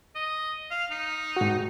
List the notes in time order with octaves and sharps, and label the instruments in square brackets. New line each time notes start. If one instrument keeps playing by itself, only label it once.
[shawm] D#5
F5
D#4
[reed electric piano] G#2 F#4